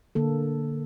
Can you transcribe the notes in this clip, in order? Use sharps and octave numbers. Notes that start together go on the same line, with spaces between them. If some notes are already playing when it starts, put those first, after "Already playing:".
D3 A#3 A4